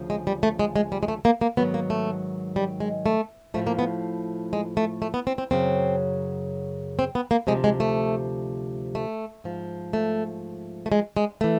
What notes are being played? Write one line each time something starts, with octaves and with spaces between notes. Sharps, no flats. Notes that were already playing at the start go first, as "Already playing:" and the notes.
Already playing: D2 C#3 F3
G#3
G3
A3
G#3
G#3
G3
G#3
A3
A#3
A#3
G#2 D#3 F#3 B3
A#3
A3
G3
G#3
A3
A2 F3 A3
A#3
B3
G#3
A3
A3
B3
C4
C4
F#2 C#3 F#3 C4
C4
B3
A#3
D2 C3 F3 G#3
G#3
A3
A3
G#2 F3
A3
A3
G#3
G#3
E3 A3